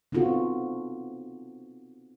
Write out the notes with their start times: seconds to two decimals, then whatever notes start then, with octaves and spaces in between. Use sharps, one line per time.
0.12 B3 C4 D#4 F4 F#4 A4